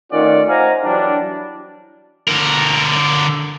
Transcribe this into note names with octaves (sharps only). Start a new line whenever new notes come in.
D#3 A3 C#4 F4 D5 F#5
C5 D#5 F5 F#5 G#5 A#5
E3 F#3 G3 D4
D3 A#4